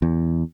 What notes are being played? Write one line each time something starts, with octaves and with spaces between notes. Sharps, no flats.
E2